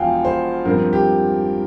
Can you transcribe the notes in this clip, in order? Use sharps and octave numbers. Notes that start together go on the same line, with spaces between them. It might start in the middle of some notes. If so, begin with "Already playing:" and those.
Already playing: E1 E2 F3 F5 G5 G#5
C5
G2 F3 C4 A#4
G4